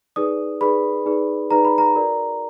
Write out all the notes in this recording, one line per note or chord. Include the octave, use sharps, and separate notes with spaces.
D#4 G#4 B4 D5 D#6
D#4 G#4 B4 D5 B5
D#4 G#4 B4 D5
D#4 G#4 B4 D5 A#5
B5
A#5
F#4 A#4 D5